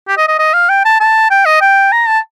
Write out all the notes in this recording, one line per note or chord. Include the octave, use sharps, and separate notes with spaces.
G4
D#5
D#5
D#5
F5
G5
A5
A5
G5
D#5
G5
A#5
A5